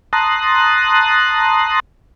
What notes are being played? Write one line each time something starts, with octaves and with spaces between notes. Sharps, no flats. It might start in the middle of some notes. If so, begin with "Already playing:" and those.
A5 A#5 C6 D#6 F#6